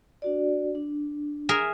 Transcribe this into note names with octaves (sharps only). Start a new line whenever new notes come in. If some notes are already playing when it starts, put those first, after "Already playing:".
D4 F#4 D5
D4
G#4 A#4 E5